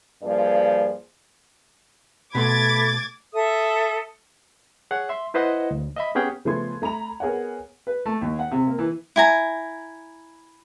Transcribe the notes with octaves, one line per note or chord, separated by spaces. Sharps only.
G2 F3 A#3 G#4 D5
B2 A3 B5 C6 D6 G#6 A6
A4 E5 D#6
G#4 C#5 F#5
E5 C6
E4 B4 C5 D#5 F#5
D2
D#5 E5 B5
B3 C#4 G4 G#4 F#5 G5
C#3 F3 A3 B3 C6 G#6
A3 A#5 B5 F7
B3 G#4 A#4 C#5 F#5
B4
A3
D#2
F#5
C3
A#3
E3
E4 G#5 A#5